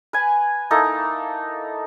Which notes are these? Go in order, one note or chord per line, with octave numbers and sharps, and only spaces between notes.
B4 G#5
A#3 D#4 E4 A4